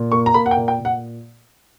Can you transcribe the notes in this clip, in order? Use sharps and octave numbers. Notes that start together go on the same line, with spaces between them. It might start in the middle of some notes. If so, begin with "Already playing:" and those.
Already playing: A#2
A#3 C#6
A#5
A#3 B5
F#5
G5
A#2
G5
A#2
F#5